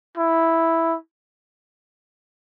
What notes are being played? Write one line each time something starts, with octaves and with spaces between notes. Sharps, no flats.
E4